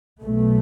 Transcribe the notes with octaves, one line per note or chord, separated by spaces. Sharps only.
B1 B2 A3